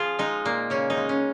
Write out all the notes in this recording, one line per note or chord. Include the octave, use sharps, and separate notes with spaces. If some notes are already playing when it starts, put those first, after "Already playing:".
Already playing: F3 F4 G#4
G#3 D#4
A#2 A#3
C#3 C#4
D#4
G#3
C#4